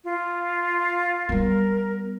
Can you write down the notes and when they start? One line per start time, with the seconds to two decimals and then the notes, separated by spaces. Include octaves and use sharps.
0.04 F4
1.29 G3 B3 A#4